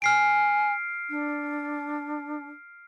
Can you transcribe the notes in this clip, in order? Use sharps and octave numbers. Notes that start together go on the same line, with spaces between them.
G#5 F6 C7 D7
D4